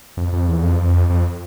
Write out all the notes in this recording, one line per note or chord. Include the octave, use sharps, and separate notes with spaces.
F2
F2
E2
F2
F2